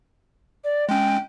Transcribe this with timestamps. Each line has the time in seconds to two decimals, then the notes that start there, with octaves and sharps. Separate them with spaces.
0.64 D5
0.89 G#3 C#4 G5